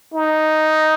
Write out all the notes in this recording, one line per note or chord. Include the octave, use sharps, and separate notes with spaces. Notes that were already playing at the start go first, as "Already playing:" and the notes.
D#4